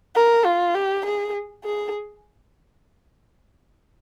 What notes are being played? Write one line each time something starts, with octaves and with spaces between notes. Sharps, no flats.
A#4
F4
G4
G#4
G#4